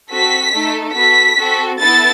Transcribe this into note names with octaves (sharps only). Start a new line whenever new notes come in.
C4 F#4 A4 B6
A3 D#4 A4
B3 F#4 A4 B6
C4 F#4 A4
B3 E4 A4 A6